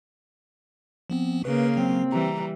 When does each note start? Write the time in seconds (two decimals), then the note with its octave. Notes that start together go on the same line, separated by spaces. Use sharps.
1.10 F3 B3 C4
1.45 C#3 A#3 B4
1.77 F#3 C4
2.12 E3 G3 A#5